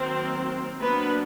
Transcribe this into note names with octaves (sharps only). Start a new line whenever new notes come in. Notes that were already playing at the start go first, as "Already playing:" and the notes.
Already playing: D#3 F#3 A#3 C4 C5
F#3 A#3 B3 D4 B4